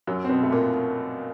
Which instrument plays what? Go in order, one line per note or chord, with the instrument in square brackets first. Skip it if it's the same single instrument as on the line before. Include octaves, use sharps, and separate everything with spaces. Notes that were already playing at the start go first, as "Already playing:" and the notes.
[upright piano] F#2 F#3
C4
B2 B3
A3
A#2 A#3